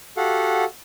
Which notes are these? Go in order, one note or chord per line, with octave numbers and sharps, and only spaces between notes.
F#4 G4 A4 F5 F#5